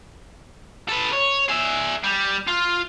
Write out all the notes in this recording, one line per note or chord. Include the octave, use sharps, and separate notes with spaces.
A4 B4
C#5
G#4 E5
G3
F4